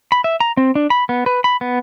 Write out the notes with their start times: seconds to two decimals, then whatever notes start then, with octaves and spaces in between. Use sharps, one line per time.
0.12 B5
0.24 E5
0.40 A#5
0.57 C4
0.75 D4
0.90 B5
1.09 B3
1.26 B4
1.44 B5
1.61 B3